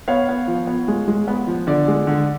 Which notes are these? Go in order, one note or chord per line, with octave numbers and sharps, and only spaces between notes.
B3 C#5 F5
B3
F3
B3
G#3
G#3
B3
F3
D3 D5
G#3
D3